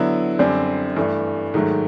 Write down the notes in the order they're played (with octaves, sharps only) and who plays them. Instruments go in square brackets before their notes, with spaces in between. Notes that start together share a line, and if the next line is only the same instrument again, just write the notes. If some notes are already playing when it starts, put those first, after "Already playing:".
Already playing: [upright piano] D3 F#3 B3 E4
F#2 D3 G3 C4
G2 E3 A3
G#2 D#3 F#3 A3